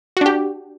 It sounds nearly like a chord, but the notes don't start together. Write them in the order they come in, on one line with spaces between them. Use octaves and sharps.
F#4 D4 G4